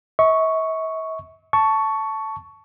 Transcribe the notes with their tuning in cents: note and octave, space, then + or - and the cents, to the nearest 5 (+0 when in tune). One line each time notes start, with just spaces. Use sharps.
E5 -45 C#6 +0
A5 +0 C#6 +10